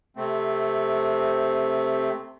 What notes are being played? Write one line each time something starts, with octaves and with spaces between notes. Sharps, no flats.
C3 A3 C4